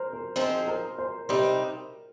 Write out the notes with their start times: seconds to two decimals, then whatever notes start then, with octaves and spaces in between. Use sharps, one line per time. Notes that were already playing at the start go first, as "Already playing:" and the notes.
Already playing: A#4 C5
0.13 A#4
0.36 F3 C4 D#4 G#4 C5
0.68 A#4
0.98 C5
1.29 C3 G3 C4 D#4 A#4